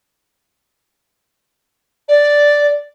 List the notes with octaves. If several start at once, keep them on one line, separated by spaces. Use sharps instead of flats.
D5